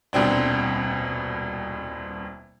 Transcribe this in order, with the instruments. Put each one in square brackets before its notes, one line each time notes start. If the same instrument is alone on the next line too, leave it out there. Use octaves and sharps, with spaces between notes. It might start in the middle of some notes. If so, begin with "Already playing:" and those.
[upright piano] D#1 C2 B2 C4 D4